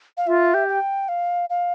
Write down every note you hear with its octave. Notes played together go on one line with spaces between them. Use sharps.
F5
F4 E5
G4
G5
F5
F5